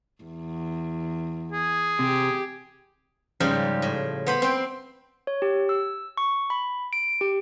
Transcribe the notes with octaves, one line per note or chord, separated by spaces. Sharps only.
E2
G#4
C3 G4
G#2 C#3 F3 G3
A2
B3 C5 B5
C4 G5
C#5
G4
E6
C#6
B5
D7
G4